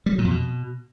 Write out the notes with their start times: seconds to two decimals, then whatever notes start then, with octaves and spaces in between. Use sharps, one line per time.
0.06 G3
0.12 F#3
0.18 A#2
0.24 F2
0.31 B2